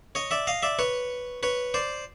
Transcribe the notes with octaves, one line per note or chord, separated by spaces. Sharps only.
C#5 D#5
D5 E5
D#5 F5
D5 E5
B4 C#5
B4 C#5
C5 D5